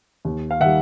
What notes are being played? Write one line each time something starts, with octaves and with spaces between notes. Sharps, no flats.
D#2
F5
D#3 G3 E5 F#5